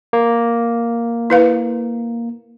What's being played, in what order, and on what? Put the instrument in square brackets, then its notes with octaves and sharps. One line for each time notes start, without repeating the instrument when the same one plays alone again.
[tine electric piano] A#3
[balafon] E4 B4 F5